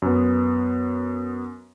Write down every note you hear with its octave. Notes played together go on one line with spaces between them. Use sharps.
F#2 B3